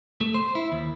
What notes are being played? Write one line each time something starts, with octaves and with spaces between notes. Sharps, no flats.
A3
C5
E4
D#2